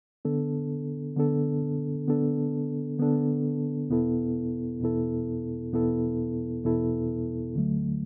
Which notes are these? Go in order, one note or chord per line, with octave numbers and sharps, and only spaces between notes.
D3 B3 D4 A4
D3 B3 D4 A4
D3 B3 D4 A4
D3 B3 D4 A4
E2 B2 B3 E4 A4
E2 B2 B3 E4 A4
E2 B2 B3 E4 A4
E2 B2 B3 E4 A4
D2 D3 F#3 A3